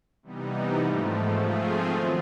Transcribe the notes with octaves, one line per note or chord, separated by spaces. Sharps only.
C3 E3 G3 B3 D#4
G#2 F3 A3
F3 A3 C4 F4 G#4
D#3 F#3 B3